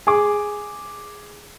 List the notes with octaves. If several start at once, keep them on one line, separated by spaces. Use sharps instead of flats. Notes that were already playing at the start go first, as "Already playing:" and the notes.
G#4 D6